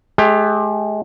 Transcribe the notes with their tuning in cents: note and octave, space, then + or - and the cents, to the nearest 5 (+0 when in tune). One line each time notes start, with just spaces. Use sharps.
G#3 +40 G4 +20